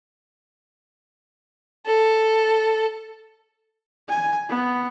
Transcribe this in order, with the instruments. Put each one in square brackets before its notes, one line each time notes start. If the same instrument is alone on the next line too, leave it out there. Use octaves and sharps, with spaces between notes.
[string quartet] A4
[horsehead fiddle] G#5
B3